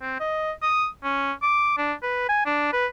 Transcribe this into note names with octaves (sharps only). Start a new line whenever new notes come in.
C4
D#5
D#6
C#4
D6
D4
B4
G#5
D4
B4